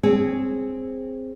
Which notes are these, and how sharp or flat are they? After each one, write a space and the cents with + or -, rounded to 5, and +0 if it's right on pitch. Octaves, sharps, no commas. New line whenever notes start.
C4 +0 G#4 -10 C#5 +0